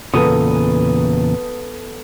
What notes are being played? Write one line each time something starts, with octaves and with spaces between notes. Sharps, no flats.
E2 A#2 C#3 B3 A4 D#6